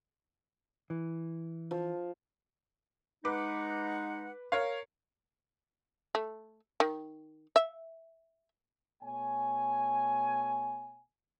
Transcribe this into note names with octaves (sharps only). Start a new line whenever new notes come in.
E3
F3
G#3 D#4 B4 F#5 D6
A#4 C#5 F5
A3
D#3
E5
B2 A3 C#5 G#5